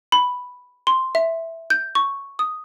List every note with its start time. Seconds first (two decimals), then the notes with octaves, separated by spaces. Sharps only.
0.12 B5
0.87 C6
1.15 E5
1.70 G6
1.95 C#6
2.39 D#6